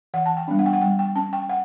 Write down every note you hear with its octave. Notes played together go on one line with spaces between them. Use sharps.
E3 F#5
A5
G5
G3 B3 D4
F#5
G5
F#5
G3 G5
G5
C#4 A5
G5
F#5